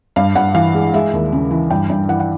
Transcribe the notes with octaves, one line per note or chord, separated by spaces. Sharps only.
G2 F5
G2 F#5
E3 F5
G#3
G#3 E5
D#2
C#3
E3
G2 G5
G2
E3 F#5
F#5